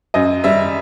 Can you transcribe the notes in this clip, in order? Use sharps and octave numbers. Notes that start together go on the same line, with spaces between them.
F#2 D#5
G3 E5